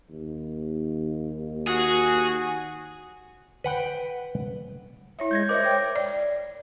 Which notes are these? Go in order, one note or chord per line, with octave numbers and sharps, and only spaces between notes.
D#2
F#4 G#4
B4 F#5 G5
E4 C#5 E5
G#3 G6 G#6 A#6
A#4 C5 D#5 E5 D6
C#5 G5
D5